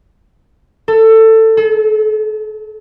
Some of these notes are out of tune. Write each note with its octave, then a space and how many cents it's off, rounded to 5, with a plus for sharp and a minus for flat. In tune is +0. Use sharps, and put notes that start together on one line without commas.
A4 +20
A4 -40